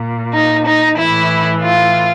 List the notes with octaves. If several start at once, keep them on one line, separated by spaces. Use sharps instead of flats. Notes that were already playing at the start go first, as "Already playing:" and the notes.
Already playing: A#2
D#4
D#4
A2 E3 E4
F4